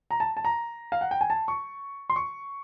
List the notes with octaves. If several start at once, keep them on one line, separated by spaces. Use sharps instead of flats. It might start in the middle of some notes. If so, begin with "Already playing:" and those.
A#5
A5
A5
A#5
F5
F#5
G5
G#5
A5
C#6
C6
C#6